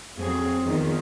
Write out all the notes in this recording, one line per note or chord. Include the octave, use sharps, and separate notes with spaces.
F2 F#3 C4 G#4
E2 D#3 F3